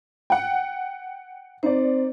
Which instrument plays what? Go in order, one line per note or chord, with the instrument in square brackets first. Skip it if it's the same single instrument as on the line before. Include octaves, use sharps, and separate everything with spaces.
[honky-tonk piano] F#5 G5
[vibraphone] C4 C5 [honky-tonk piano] D#4 D5